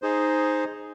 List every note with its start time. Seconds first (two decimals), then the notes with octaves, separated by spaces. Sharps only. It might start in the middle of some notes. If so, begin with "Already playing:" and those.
0.02 D#4 G#4 C5